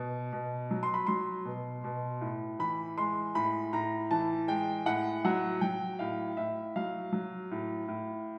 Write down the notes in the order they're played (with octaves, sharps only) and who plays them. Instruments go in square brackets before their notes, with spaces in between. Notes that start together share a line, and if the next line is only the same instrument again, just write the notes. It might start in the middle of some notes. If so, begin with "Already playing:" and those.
Already playing: [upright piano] B2
B2
F#3
C6
B5
F#3 C6
B2
B2
A2
E3 B5
G#3 C6
A2 B5
A2 A#5
E3 A5
G#3 G5
A2 F#5
F#3 F#5
F#3 G5
A2 F5
A2 E5
F#3 F5
F#3
A2
A2